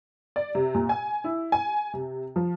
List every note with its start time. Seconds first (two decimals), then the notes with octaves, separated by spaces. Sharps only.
0.36 D5
0.55 C3
0.75 A#2
0.89 G#5
1.24 E4
1.52 G#5
1.94 C3
2.36 F3